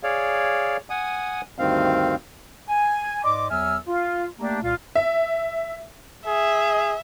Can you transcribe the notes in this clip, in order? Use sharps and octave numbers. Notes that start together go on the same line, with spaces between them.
G#4 C#5 D5 F5
F#5 G#5 D#6
D2 G2 D#3 C4 F5
G#5
G#2 D5 D#5 C6 D6
E2 F#3 E5 G#5 E6 F6
F4
A3 A#3 D4 G4
C2 A#2 F4
E5
G#4 E5